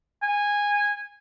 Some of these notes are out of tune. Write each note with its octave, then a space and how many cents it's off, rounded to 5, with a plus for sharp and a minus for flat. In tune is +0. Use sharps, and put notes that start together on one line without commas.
G#5 -15